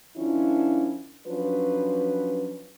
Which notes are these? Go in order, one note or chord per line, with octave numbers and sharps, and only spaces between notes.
D#3 F3 C#4 D4 E4 F4
F3 F#3 C#4 D4 B4